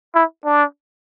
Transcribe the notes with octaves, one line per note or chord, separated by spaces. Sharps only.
E4
D4